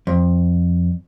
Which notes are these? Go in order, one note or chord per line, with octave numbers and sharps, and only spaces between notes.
F2